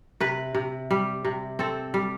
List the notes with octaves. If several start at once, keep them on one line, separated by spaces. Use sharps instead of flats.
C3 B4
C3
G3
C3
C4 A4
G3